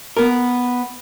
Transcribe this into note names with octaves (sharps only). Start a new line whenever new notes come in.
B3 A#4